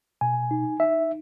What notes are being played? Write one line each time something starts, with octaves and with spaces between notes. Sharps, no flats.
B2 G#5
D#4
D#4 E5